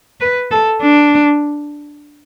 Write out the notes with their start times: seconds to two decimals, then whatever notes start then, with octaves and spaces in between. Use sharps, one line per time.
0.21 B4
0.51 A4
0.82 D4